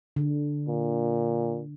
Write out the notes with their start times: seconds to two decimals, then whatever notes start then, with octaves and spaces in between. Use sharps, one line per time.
0.16 D3
0.68 A#2